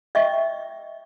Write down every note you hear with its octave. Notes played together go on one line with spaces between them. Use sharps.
D#5 E5 G5 C#6